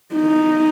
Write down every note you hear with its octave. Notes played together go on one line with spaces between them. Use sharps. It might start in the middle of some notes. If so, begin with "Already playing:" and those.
D#4